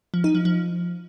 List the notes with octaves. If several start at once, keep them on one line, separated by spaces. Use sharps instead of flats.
F3
D#4
F3
F3